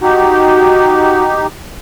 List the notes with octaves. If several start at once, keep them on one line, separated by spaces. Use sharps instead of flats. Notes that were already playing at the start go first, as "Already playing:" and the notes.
D#4 F#4 G4